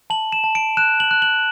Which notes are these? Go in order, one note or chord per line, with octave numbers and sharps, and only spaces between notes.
A5 F#7
E7
A5
D7
F#6 E7
F#7
F#6
F#7